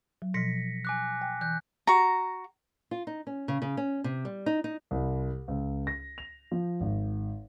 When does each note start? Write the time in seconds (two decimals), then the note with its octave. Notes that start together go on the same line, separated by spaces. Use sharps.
0.22 F#3
0.34 B2 F3 A#6 B6 C#7
0.85 G#5 D6 F#6
1.22 G5
1.41 E3 F#6 G6
1.87 F#4 A#5
2.91 F4
3.07 D#4
3.27 C#4
3.48 C#3
3.62 C#3
3.77 C#4
4.04 C3
4.25 G3
4.46 D#4
4.64 D#4
4.91 C2
5.48 C#2
5.87 A#6
6.18 F7
6.52 F3
6.80 G#1